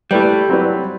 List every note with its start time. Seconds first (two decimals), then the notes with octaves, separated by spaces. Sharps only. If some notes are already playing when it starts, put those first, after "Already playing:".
0.11 G3 A3 E4 B4 D5
0.49 F#3 C4 E4 B4 D5